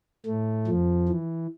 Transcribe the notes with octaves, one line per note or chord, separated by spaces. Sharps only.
A2 A3
F2 F3
E3